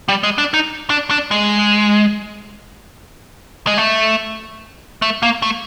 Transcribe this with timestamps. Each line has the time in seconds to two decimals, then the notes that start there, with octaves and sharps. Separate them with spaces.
0.08 G3
0.23 G#3
0.38 D4
0.54 D#4
0.90 D4
1.11 D4
1.31 G#3
3.67 G#3
3.78 A3
5.02 A3
5.23 A#3
5.42 A3